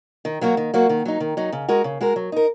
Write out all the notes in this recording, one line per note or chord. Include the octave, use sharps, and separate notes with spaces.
D#3
F#3 A#3 F#4
D#3
F#3 A#3 F#4
D#3
F#3 D#4
D#3
F#3 D#4
C#3
G#3 F#4 A#4
C#3
G#3 F#4 A#4
F#3
D#4 A#4